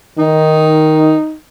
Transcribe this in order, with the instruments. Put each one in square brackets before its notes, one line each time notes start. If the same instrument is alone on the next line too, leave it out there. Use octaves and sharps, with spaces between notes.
[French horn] D#3 [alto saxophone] D#4